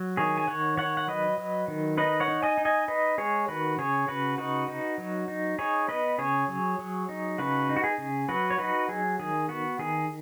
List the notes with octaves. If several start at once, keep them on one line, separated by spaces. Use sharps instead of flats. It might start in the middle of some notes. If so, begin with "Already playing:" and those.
Already playing: F#3
D#3 G#4 C#5
G#5
D#3 C#5 F#5
D#3 C#5 F#5
F#5
F#3 B4 D#5
F#3
D#3
D#4 B4 D#5
C#5 F#5
D#4
D#5 G#5
D#4
D#5 G#5
D#4 B4 D#5
G#3 G#4 C#5
D#3 F#4 B4
C#3 G#4 C#5
C#3 F#4 B4
D#4 F#4 B4
D#4
F#3
D#4
D#4 G#4 C#5
B3 B4 D#5
C#3 G#4 C#5
F#3
F#3
D#4
C#3 F#4 B4
D#4
F#4
G#4
C#3
F#3 F#4 B4
C#5
D#4 F#4 B4
F#3 G#4
D#3 G#4
B3 F#4
D#3 G#4